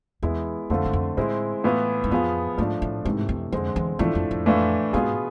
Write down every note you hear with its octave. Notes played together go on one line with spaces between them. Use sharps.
E2 G#3 B3 E4
F2 D3 A3 C4 F4 A4
G#2
F2
A2 G#3 C4 E4
A2 E3 B3 F4
G#2
F2 F3 B3 F4 G#4
G#2 F3 A3 D4
A2
G#2 C3 E3 A3
F2
F2 D3 G#3 C4
E2
E2 A2 F3 A3 D4
F2
F2
A2 E3 A3 D4 F4
G#2 B2 B3 F4 G#4